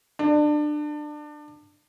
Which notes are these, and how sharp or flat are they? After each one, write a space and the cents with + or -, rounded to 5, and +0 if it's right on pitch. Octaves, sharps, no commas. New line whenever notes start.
D4 +25